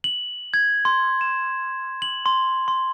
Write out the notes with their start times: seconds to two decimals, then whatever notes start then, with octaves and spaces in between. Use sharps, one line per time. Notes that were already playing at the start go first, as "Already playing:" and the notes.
0.04 F#7
0.54 G#6
0.85 C6
1.21 E7
2.02 F#7
2.26 C6
2.68 C6